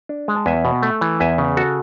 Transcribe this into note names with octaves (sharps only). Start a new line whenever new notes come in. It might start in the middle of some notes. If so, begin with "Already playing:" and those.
D4
G#3
A5
E2 E5 G#5
B2
A3
E3
E2 E5 G#5
C#3
F#4 A4